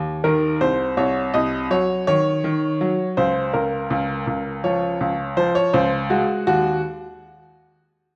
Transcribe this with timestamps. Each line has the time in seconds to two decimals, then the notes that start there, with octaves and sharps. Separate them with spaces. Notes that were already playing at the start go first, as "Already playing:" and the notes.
Already playing: D#2
0.24 D#3 A#4
0.61 C2 C5
0.97 C2 C#5
1.34 C2 D#5
1.71 F#3 C#5
2.07 D#3 C#5
2.44 D#3
2.81 F#3
3.17 C#2 C5
3.54 C#2 A#4
3.90 C#2
4.27 C#2
4.64 F3 C#5
5.01 C#2
5.37 F3 C5
5.55 C#5
5.73 C#2 C5
6.10 G#3 F#4
6.47 D#2 F#4